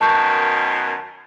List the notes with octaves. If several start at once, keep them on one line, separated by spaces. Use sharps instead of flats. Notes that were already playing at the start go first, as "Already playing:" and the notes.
F#2 B2 D#3 A5 C#6 G6